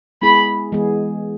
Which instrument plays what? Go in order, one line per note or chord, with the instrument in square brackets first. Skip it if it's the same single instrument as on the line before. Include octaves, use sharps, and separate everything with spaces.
[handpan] G#3 B3 E4 G#4 [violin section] B5
[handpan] E3 G#3 B3 G#4